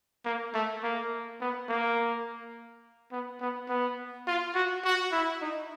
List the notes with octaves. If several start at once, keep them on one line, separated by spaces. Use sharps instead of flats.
A#3
A3
A#3
B3
A#3
B3
B3
B3
F4
F#4
F#4
E4
D#4